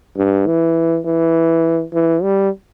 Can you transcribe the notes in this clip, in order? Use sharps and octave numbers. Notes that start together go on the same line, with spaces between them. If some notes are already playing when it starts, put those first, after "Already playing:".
G2
E3
E3
E3
G3